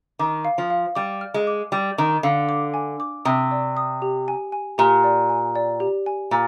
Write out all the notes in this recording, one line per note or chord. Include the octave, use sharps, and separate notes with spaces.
D#3 D6
F5
F3
F5
G3 D6
F6
G#3
D6
G3 D6
D#3 D6
D3 F5
D6
G#5
D6
C3 D#6
D5
D#6
G4
G#5
G#5
A#2 G4
D5
G#5
D5
G4
G#5
A#2 G#5